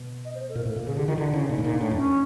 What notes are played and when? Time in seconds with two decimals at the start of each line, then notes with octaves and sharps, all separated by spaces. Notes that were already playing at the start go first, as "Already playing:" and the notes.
Already playing: B2
0.25 D#5
0.35 C5
0.49 A4
0.55 A#2 A#4
0.65 A2
0.71 A4
0.76 A#2
0.87 C#3 G#4
0.97 D3 G4
1.08 D#3 F4
1.18 D3 E4
1.33 C#3 E4
1.49 A#2 D#4
1.58 A2
1.64 A#2 D#4
1.80 A2 D4
1.91 F2
1.95 C#4